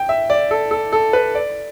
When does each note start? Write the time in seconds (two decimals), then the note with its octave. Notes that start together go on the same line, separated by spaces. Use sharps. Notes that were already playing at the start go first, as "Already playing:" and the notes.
Already playing: G5
0.09 E5
0.30 D5
0.51 A4
0.71 A4
0.93 A4
1.13 B4
1.35 D5